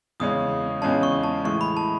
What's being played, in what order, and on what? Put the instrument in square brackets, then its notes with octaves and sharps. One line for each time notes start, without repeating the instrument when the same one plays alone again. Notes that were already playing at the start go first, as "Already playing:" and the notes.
[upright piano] E2 C#3 G#3 C#4 [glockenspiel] D#6
[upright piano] E2 C#3 G#3 C#4 [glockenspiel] A5
[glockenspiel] C#6
A5
[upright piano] A2 E3 G#3 [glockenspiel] C#6
[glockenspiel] B5
A5